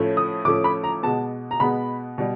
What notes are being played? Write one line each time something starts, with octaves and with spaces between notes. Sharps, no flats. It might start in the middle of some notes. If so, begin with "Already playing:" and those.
Already playing: A2 F3 A3 C#4
D#6
A2 F3 A3 C#4 D6
B5
A#5
B2 G#3 B3 A5
A#5
B2 G#3 B3 B5
B2 G3